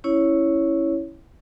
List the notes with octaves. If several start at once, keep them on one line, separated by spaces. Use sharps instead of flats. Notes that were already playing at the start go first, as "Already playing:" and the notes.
C#4 E4 C#5